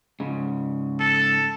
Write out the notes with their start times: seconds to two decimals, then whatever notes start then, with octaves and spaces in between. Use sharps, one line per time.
0.20 G#2 C#3
1.00 A4